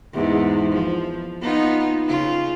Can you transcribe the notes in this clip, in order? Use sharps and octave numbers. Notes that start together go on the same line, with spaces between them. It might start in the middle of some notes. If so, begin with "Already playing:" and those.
E2 G#2
F3
B3 D#4 F4
C#3 F4